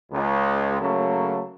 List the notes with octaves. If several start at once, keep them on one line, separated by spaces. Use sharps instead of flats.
C#2
C#3 F#3 A3 A#3